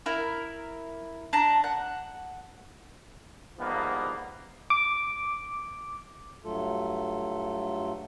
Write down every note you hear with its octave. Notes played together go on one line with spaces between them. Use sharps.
E4 A#4
D4 A5 A#5
F#5
E2 G#2 F3 G3 A#3 B3
D6
G2 F#3 A3 F4 A4